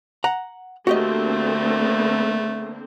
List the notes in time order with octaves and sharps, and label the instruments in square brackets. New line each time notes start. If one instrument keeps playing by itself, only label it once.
[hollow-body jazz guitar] F#5 A#5
[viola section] D3 A#3 C4 [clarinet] A3 [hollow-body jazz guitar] F#4 G4 D#5